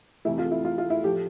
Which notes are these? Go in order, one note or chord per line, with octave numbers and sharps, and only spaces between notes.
F2 C3 E3 A3 E4
F4
E4
F4
F4
E4
A2 F3 A3 G4